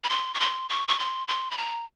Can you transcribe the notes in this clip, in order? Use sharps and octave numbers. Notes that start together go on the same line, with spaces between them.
B5
C6
C#6
C6
C#6
C#6
C6
C6
B5
A#5